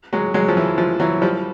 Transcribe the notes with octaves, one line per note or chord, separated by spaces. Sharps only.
F#3 G#3
F#3 G#3
F3
E3
F3
E3 F#3
F3 G3